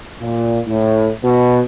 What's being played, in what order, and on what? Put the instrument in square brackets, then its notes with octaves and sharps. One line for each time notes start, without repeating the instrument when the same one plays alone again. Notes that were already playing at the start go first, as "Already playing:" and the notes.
[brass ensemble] A#2
A2
B2